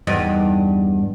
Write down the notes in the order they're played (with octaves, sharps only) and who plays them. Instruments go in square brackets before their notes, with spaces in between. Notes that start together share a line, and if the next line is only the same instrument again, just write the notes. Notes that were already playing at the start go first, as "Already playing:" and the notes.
[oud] E2 G2 D#4